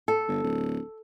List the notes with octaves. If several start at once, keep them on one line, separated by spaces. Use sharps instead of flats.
A4
G1
D1